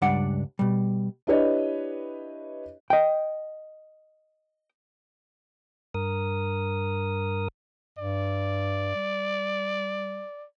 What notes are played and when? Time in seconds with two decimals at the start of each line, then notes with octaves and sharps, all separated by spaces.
0.02 C#2 G2 G3 D4 D5 F#5
0.59 B2 G3
1.27 D4 E4 G4 B4 C#5 D#5
2.90 D#5 G5
5.94 G2 A#4 D#6
7.98 G2 D5
8.95 G3